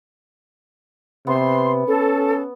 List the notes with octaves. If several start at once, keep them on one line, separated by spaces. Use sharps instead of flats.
C3 B3 C6
C#4 A4